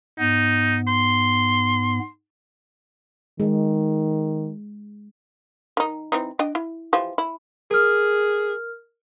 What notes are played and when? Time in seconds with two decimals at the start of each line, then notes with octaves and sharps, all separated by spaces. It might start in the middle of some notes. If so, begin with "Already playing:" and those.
0.19 G#2 B3 D#4
0.87 C6
3.40 D#3 G#3
5.77 D#3 D#4
6.12 E3 C4 D#4
6.39 D4 D#5 G5
6.55 E4
6.93 E3 F3 G4
7.18 E4
7.71 G#4 A#4 F6